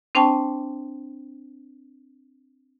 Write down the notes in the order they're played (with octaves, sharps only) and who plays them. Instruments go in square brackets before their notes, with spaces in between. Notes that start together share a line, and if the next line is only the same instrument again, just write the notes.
[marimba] C4 D4 C5 G5 A5 C#6